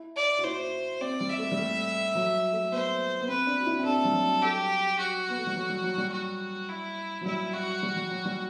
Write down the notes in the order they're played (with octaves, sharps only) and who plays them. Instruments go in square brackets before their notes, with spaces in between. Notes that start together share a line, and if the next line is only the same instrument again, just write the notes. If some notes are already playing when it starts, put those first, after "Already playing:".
Already playing: [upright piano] E4
[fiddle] D5
[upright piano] F#4
[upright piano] E4 [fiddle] C5
[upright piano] C4 [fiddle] D5
[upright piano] G3
[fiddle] E5
[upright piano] A3
G3
A3
F#3
A3
[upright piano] B3 [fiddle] C5
[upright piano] B3
[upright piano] C4 [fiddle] B4
[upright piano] D4
F#4
E4
C4
[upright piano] D4 [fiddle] A4
[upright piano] A3
G3
F#3
[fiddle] G4
F#4
[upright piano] B3
A3
G3
F#3
G3
F#3
G3
[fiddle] F#4
E4
[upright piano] F#3
[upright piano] G3 [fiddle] E4
[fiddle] F#4
[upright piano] G3
G3
F#3
G3